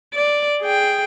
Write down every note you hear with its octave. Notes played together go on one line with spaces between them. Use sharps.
D5
G#4 G5